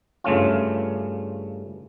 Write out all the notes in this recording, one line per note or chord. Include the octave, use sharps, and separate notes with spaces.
G2 C#3 A3 C#4 F4